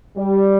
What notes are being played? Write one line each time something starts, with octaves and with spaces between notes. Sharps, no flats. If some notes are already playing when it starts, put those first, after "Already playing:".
G3